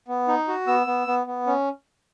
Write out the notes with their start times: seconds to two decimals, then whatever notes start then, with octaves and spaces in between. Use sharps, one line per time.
0.08 B3
0.28 D#4
0.48 F#4
0.67 B3 E6
0.87 B3
1.07 B3
1.27 B3
1.47 C#4